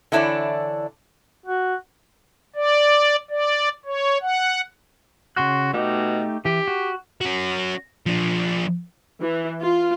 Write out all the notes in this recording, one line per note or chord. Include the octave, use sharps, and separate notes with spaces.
D3 E3 D4 E4 C#5 D5
F#4
D5
D5
C#5
F#5
C#3 F#4 C6 F#6
B2 A3 D#4 G4
E3 G4
F#4
C#4 F#4
F3 D4
E3
F4